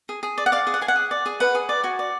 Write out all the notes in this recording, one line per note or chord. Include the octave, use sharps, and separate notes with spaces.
G#4
G#4
D5
F#5
D5 F5
G#4
F#5
G#4 G#5
F#5
G#4
D5
G#4
B4 F#5
G#4
D5
F#4 G#5
D5